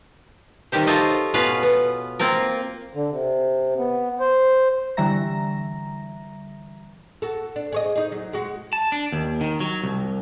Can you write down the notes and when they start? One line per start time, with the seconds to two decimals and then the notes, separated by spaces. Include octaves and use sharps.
0.72 C3 D#3 G3 G4 C5
0.87 F4 A4 C5 C#5 D#5
1.34 B2 B3 C#4 F4 B4 F5
1.63 B3
2.19 A#3 C4 F4 A#4
2.94 D3
3.11 C3
3.77 B3
4.20 C5
4.97 D3 E3 G3 E5 A#5 A#6
7.22 F#4 A4
7.56 D4
7.72 G#4 C#5 D#5
7.95 D#4 G#4
8.12 F#3
8.33 G#3 F#4
8.73 A5
8.92 D4
9.12 D#2
9.41 D#3
9.60 F#3
9.84 C2